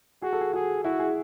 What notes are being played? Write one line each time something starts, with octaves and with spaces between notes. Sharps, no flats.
F#4 G#4
A4
G#4
F#4 G#4
E4 F#4
G#4